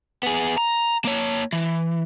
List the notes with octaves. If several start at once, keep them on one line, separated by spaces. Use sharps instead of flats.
B3 G#4
A#5
A#3 C#5
E3